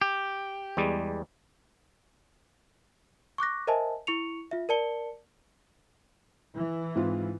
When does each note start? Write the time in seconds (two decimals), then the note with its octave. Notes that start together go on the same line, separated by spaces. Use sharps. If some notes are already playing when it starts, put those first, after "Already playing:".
0.01 G4
0.77 E2 G3 G#3
3.38 C#6 D6 F#6 A#6
3.67 A#4 C5 D#5 E5 G#5 A5
4.07 E4 C#6 C#7 F7
4.51 F4 E5
4.69 A#4 D5 A5 C#7 G7
6.56 E3
6.95 G#2 C4 F4